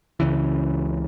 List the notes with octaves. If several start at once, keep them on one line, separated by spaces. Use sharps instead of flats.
C#2 C#3 E3